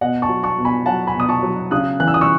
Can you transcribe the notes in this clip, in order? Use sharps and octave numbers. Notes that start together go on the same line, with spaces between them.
B2 D#5 F#5
A5 C#6
F#3
A5 C#6
B2
G#5 B5
F#3 F#5 A5
G#5 B5
B2 D#6
A5 C#6
F#3
C#3 D#6 F#6
E3 F#6
E6
D#6
C#6 E6